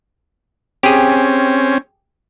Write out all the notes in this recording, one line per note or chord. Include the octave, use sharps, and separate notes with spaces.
C4 C#4 G4 G#4